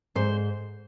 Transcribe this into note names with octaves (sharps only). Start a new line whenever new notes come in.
G#2 C5